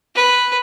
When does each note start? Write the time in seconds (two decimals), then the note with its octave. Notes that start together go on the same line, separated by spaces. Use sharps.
0.15 B4